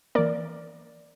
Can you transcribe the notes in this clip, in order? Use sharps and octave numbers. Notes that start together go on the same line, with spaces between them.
E3 A#3 A#4 D5